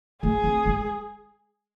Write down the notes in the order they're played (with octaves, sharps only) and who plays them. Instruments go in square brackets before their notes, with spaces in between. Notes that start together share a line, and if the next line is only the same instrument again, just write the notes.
[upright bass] A3 [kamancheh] G#4
[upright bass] C4
G#3